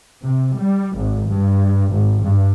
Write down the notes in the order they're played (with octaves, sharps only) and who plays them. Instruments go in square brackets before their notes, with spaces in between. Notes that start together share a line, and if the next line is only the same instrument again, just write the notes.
[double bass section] C3
G3
G#1
G2
G#1
G2